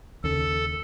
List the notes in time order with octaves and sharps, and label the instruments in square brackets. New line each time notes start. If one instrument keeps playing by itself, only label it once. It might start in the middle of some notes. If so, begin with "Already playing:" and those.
[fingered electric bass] D#2 C#3 [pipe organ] A4